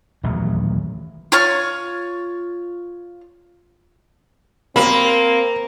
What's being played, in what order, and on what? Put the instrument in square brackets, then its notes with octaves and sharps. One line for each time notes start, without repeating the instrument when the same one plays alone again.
[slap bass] D#1 A1 E2 F#3
[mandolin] F4 C#5 C#6 F6
[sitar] A#3 [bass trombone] C4 [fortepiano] B5